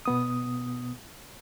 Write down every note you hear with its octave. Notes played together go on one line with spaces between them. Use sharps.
B2 B3 D#6